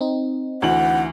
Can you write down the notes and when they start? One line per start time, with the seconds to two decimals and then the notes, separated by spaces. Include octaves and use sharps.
0.01 C4 D#4
0.62 D2 E3 F#5 F#7